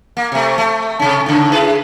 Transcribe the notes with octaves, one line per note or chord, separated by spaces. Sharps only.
A#3
C3 A3
A3
C3 C#4
A2 C#3
E4 G#4 B4